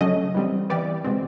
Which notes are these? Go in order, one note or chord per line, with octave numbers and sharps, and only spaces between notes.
C#3 F#3 A3 C#4 D#5
E3 G3 C4
E3 G3 B3 D5
B2 G#3 C4